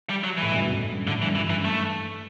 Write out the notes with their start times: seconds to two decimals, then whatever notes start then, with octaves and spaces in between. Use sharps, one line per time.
0.10 G3
0.24 F#3
0.37 A2 E3
0.52 G2 B2
0.62 B2
0.70 F#2 A2
0.89 G2
1.07 A2 D3
1.19 G2 E3
1.31 F#2 E3
1.42 G2
1.50 E3
1.65 A3